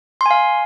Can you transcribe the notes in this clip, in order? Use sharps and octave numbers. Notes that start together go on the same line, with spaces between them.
F5 G#5 C6